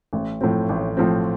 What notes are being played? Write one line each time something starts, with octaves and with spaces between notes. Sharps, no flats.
A1
A2 F3 C4
A1
A2 F3 C4